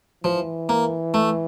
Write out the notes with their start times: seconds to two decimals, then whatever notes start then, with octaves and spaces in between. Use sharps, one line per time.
0.24 E3 F3
0.69 A#3
1.14 A3